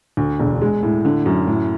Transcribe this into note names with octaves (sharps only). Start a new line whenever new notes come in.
D2
E1
G#3
A2
D3
F#2
A2